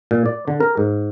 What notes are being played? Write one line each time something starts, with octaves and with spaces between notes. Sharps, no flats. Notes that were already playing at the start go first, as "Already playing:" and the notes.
A#2
D5
D3
A#4
G#2